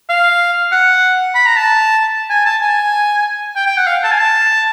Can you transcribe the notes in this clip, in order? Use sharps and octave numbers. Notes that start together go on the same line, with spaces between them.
F5
F#5
B5
A#5
A5
G#5
A5
G#5
G5
G5
F#5
F5
A5
G#5
A5